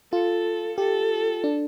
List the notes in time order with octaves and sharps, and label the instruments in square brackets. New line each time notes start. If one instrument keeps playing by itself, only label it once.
[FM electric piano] F4 [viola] A4
[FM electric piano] G4 [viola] A4
[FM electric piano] D4